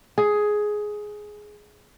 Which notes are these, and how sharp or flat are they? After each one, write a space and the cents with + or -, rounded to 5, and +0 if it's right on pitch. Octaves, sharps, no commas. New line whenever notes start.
G#4 +10